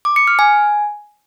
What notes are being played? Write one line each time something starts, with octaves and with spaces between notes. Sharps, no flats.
D6
C#7
F6
G#5